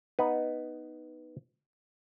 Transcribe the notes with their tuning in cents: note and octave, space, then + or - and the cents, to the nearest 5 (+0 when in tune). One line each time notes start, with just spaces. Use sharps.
B3 +0 D#4 +0 B4 +0